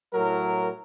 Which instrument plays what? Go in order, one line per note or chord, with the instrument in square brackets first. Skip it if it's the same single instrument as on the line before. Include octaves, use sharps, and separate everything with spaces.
[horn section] A2 F#3 A#4